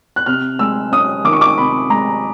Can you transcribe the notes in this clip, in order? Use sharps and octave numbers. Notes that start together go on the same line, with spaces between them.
F#6
C3 F6
G#3 E6
C#4 D#6
D#3 D6
C#6
D6
C3 B5
G#3 A#5